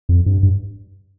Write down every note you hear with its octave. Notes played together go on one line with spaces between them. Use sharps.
F2
G2
G2